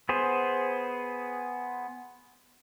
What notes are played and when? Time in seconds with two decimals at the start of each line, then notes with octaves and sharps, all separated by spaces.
0.09 B3 G#4 C5